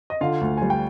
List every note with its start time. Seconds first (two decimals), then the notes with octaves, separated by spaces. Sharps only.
0.10 D#5
0.21 D3 F4 F5
0.41 D2
0.57 G3 G#5
0.70 G5